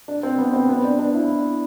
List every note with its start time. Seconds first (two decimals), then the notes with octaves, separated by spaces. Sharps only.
0.08 D4
0.23 C4
0.38 B3
0.53 C4
0.69 B3
0.84 D4
0.99 D4
1.14 E4